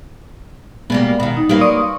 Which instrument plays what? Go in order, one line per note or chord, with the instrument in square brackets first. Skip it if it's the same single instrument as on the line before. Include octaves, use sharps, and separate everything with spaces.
[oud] B2 G3 A#3 [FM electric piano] G#3 B3
[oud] B2 D#3
[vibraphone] D#4
[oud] F#3 A#3 B4 [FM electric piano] G3
[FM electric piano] D5 C#6 D#6 [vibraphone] C6